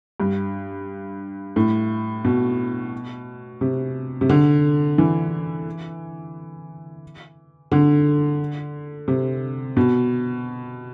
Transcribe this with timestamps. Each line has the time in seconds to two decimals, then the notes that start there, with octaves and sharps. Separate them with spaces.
0.20 G2
1.56 A2
2.24 B2
3.61 C3
4.21 C3
4.29 D3
4.98 E3
7.72 D3
9.08 C3
9.77 B2